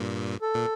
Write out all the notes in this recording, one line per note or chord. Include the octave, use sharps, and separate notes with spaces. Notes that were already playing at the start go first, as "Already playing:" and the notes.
Already playing: G2 A#2
A4
A#2